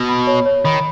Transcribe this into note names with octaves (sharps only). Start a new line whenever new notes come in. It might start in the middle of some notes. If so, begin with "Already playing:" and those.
Already playing: B2
B5
C#5
C#5
D#3 B5